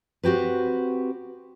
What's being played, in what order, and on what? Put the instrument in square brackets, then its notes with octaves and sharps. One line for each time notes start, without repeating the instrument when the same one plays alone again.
[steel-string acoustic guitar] C4 F#4 G4 B4